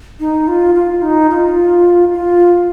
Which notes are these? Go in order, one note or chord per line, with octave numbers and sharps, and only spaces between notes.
D#4
F4
F4
D#4
F4
F4